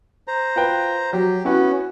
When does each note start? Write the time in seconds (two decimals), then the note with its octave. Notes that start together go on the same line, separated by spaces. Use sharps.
0.28 C5 A#5
0.56 F4 B4 G5
1.13 F#3 G4
1.45 B3 C#4 E4 F#4